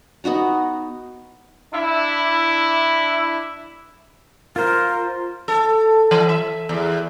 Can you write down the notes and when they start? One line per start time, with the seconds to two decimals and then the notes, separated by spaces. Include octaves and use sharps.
0.24 B3 D#4 F#4 A#5
1.74 D4 E4
4.56 F4 A#4 C5
5.48 A4
6.11 E3
6.29 E5
6.69 E2